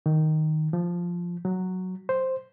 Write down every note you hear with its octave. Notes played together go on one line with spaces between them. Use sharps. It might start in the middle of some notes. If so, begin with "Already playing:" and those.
D#3
F3
F#3
C5